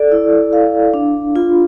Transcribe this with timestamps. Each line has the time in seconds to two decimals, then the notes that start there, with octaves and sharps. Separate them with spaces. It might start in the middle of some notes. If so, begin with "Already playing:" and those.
Already playing: A4 D5
0.12 E4
0.53 F5
0.94 D4
1.36 F4